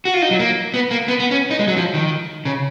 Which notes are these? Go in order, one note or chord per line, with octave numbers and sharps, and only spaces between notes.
F#4
F4
D#4
F#3
A#3
B3
A#3
B3
B3
C#4
D#4
G#3
F#3
F3
D#3
C#3